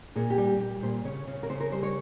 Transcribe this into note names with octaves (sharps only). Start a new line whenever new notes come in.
A#2 G#4
G4
G3
G4
G3 G4
A#2 C5
C#3 C#5
C#3
A#4
C#3 C5
A#4
G3 C5
C#5